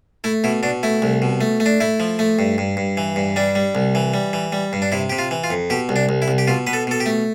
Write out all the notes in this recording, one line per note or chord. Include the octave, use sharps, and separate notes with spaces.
A3 E4
B2 E4
B2 D4
A3 E4
C2
B2
A3
A3
D4
A3 E4
F3
A3
G2
G2
G2
E3
G2
G3 D4
G3
C2
E3
G3
E3
G3
G2
D4
C3 E4
C3 G4
F4
E3
F4
F2
B2 G4
C2
D4
C2
E4
C2
G4
B2 F4
B2 B4
A4
B2 A4
G4
A3